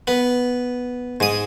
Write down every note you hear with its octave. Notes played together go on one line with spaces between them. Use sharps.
B3
G#2 D#6